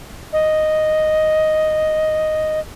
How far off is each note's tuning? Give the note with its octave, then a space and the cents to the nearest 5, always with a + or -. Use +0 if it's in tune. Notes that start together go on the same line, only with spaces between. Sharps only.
D#5 +0